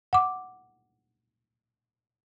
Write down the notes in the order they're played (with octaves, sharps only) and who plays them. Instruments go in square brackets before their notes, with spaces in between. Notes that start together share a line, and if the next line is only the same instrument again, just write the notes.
[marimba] F#5 D6